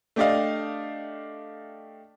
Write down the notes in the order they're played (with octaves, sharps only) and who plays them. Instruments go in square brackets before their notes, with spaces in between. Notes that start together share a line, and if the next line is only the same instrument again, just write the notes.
[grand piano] A3 D4 G4 D5 D#5 F5